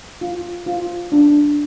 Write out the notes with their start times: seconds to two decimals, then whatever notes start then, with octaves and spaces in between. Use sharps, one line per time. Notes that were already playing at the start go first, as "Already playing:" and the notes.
0.21 F4
0.66 F4
1.12 D4